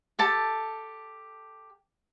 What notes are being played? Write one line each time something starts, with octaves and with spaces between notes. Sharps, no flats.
G4 A4 A5